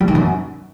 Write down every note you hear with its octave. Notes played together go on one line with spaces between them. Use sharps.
G3
D#3
F#2